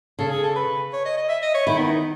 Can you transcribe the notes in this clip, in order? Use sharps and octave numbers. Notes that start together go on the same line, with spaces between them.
C#3 A4
G#4
A4
B4
C#5
D#5
D#5
E5
D#5
C#5
D#3 E4
B3
D#4